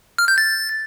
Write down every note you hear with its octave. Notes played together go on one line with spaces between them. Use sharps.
F6
G6
A6